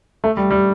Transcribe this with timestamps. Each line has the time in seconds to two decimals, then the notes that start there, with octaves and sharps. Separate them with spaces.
0.24 A3
0.37 G3
0.51 G3